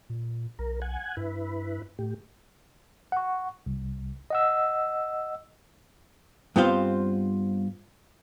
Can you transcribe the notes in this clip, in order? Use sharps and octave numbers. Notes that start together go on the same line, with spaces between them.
A#2
B1 A#4
F#5 G#5
G2 E4 B4
A2 G4
F#5 C#6
C2
D#5 F#5 E6
G2 B3 C4 F4 C5 F5